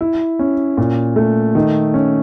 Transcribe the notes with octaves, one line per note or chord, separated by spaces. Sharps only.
E4
C#4
A#2
A3
D#3
C#4